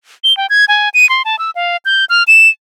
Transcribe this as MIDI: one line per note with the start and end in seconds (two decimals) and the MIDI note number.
0.24 0.35 103
0.37 0.47 79
0.50 0.65 92
0.68 0.89 80
0.94 1.08 99
1.09 1.22 84
1.25 1.38 81
1.39 1.51 88
1.55 1.77 77
1.85 2.05 91
2.09 2.23 89
2.28 2.49 100